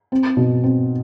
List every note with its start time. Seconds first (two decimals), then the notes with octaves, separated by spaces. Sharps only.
0.12 C4
0.37 B2
0.64 C4